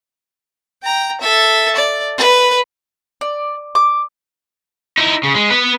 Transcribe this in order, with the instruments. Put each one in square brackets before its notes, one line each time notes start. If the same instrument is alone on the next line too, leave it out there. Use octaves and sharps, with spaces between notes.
[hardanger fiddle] G5 A#5
A4 E5
D5
B4
[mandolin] D5
D6
[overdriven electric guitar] D#4 E4
C#3
G#3
B3 B4